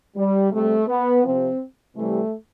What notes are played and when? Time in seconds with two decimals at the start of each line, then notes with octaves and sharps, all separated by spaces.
0.16 G3
0.51 C3 G3 A3
0.88 B3
1.24 C3 F3 C4
1.96 C3 E3 G3 A3